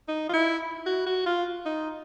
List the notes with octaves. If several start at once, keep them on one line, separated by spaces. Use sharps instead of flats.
D#4
F4
E4
F#4
F#4
F4
D#4